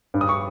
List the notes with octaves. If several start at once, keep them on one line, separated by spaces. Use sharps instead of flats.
G2
D#6
C#6